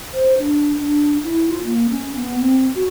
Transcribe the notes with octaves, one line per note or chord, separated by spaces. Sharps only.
C5
D4
D4
E4
F4
A#3
C#4
B3
C4
F#4